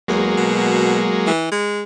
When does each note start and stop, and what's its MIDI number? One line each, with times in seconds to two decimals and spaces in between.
0.08 0.33 40
0.08 1.32 54
0.08 1.32 56
0.08 1.32 58
0.37 1.12 47
1.27 1.47 52
1.52 1.83 56